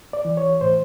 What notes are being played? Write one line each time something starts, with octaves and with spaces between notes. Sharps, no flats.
D5
E3
C#5
A2 C5